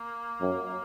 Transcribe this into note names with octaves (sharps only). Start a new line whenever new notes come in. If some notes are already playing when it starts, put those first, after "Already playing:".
Already playing: A#3
F#2